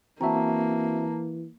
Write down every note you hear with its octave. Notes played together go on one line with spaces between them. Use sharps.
E3 A#3 C4 F#4 E5 A5 A#5